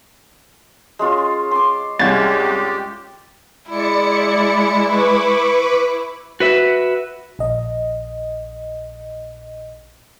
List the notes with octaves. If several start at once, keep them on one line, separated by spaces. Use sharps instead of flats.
G#3 C#4 F4
C6 D6
C2 G#3 C#4 G4 G#6 A6
G#3 E4 D5 C#7
B4 C#6 D6
F#4 B4 E5
A#1 D#5